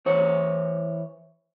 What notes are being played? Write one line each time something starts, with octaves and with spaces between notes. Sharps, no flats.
E3 C5 C#5